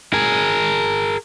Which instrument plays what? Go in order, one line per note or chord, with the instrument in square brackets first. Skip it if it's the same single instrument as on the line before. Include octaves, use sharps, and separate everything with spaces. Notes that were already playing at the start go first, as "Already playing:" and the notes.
[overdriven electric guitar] G#4 A#4